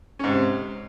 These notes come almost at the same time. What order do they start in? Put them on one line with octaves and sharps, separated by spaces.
C#4 G#2 C3